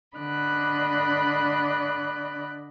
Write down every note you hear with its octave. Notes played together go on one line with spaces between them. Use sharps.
D3 D5 D#5 B5 F#6